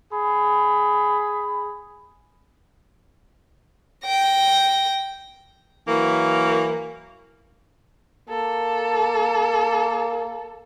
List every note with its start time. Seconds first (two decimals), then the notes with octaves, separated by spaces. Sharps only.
0.13 G#4 B5
4.06 G5 A#6
5.88 E3 F#3 A#3
8.29 A#3 A4